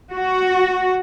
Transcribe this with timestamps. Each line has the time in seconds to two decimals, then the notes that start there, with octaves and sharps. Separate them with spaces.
0.13 F#4